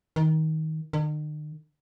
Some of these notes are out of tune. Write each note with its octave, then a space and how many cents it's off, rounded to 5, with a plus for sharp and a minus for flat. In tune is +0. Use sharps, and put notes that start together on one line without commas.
D#3 +20
D#3 -45